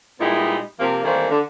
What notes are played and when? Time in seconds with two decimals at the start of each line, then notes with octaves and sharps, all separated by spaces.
0.20 A#2 G3 G#3 B3 D#4 E4
0.79 C3 F3 A#3
1.04 D#3 E3 G3 A3 A#3 C4
1.30 D3